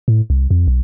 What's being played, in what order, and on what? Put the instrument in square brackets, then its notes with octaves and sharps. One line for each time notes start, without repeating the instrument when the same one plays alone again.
[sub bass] A2
C2
F2
B1